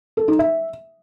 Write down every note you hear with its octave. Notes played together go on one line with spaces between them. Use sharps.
A4
D#4
E5